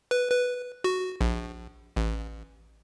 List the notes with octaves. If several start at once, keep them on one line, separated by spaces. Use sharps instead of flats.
B4
B4
F#4
A#1
A1